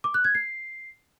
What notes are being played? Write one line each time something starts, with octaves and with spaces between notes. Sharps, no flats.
D6
F#6
G#6
C7